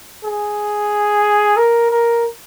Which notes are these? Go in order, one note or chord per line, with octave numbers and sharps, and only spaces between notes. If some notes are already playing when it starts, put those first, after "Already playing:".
G#4
A#4
A#4